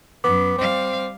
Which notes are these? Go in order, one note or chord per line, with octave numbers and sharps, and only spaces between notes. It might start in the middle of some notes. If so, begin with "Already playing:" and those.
F#2 B3 D6
G3 C4 F5